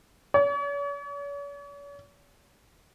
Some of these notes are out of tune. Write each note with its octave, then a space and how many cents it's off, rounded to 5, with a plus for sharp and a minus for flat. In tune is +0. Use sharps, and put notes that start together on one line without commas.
C#5 +45